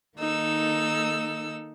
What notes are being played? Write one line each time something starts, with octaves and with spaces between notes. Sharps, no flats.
D#3 A#3 D#4 A4 E6